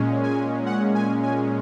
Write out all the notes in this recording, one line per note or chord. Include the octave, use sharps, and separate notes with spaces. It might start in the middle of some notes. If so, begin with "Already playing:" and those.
Already playing: A#2 G#3 C#4
G#5
F#5
G#5
G#5